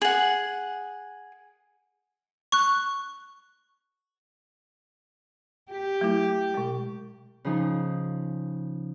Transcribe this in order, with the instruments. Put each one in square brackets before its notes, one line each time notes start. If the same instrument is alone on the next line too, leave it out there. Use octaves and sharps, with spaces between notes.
[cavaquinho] G#4 F#5
[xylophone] C#6 F#6
[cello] G4
[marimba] F#3 A3 E4
B2 G#3
[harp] C#3 F3 D#4